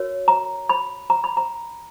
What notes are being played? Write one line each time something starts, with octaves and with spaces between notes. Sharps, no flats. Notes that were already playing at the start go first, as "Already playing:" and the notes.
Already playing: F#4 A#4 C#5
A#5
B5
A#5
B5
A#5